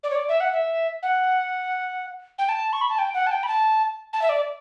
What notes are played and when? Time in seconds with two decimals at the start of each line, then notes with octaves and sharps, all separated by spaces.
0.03 D5
0.10 C#5
0.15 D5
0.28 E5
0.40 F#5
0.53 E5
1.03 F#5
2.39 G5
2.49 A5
2.73 C#6
2.81 B5
2.89 A5
2.98 G5
3.14 F#5
3.27 A5
3.31 G5
3.43 B5
3.48 A5
4.13 A5
4.22 E5
4.29 D5